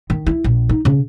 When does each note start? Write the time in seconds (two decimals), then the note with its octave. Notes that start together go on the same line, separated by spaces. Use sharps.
0.10 D#3
0.26 E4
0.44 A#1
0.69 D#4
0.85 C#3